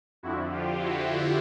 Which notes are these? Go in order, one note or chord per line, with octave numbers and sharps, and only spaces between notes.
F2 D3 F3 E4 F#4
F4 G4
E4 F#4